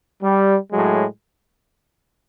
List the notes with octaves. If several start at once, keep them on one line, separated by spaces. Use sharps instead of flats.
G3
A2 F#3 G#3